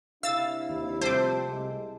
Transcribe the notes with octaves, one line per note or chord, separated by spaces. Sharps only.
C3 D4 E4 F5 E6 A6
D#2
C3 F3 G3 A3 C4 C5 D6
C2 G#3